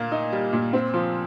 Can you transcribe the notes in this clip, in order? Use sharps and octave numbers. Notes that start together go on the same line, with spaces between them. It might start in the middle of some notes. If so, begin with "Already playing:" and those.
Already playing: A#2 A#3
D#4
G3
A#2
C4
F3